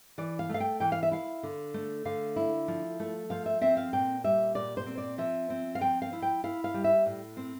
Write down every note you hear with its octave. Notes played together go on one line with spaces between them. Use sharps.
E3 D5
F5
A3
F5
G5
E3 G5
F5
E5
E4 F5
D3
A3
D3 F5
E4
F3
A3
F3 F5
E5
C4 E5
F5
A#2 G5
G3 E5
A#2 D5
C5
C4
D5
F3 E5
C4
F5
F3 G5
F5
E4
G5
E4 F5
F5
G3
E5
A2
C4